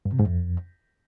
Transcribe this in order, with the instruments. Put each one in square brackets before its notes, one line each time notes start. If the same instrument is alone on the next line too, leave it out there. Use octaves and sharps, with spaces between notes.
[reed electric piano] G2
C3
G#2
F2